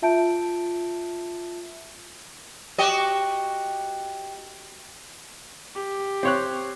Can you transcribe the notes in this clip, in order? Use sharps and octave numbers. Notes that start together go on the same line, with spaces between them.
F4 E5 A5 G6 D7
F#4 G4 D#5
G4
C4 C#5 F#6